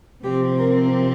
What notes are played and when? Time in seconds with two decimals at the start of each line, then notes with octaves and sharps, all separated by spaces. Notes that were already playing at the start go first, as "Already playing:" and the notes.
0.23 C3 F3 C4 G4
0.58 A#4